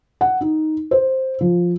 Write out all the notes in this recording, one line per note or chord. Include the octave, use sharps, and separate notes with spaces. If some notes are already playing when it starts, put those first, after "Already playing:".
F#5
D#4
C5
F3